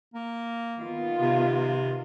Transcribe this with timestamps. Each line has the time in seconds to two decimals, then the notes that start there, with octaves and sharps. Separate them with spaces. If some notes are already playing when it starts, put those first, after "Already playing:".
0.14 A#3
0.78 D#3 B3 F4
1.20 C3